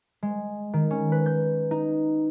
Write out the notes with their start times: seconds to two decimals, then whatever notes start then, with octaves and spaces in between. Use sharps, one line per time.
0.23 G#3
0.73 D#3
0.91 C#4
1.12 B4
1.26 G6
1.71 D#4